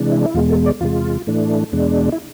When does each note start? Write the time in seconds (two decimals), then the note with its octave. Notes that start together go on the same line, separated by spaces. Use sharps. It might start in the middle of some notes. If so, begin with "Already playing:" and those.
Already playing: C3 E3 G#3 D4
0.12 E4
0.26 E4
0.34 E2 B2 G#3 F4
0.50 A4
0.66 D5
0.81 E2 C3 G#3 F4
1.27 A2 E3 A3 D4
1.72 E2 B2 G#3 D4
2.12 E4